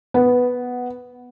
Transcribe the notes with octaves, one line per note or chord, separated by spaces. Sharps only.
B3